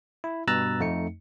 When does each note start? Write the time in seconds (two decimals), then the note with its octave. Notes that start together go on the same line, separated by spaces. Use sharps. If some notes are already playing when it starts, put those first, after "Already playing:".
0.24 E4
0.47 G2 B2 A#5 E6 F#6 A6
0.80 F2 A3 D#4 C#7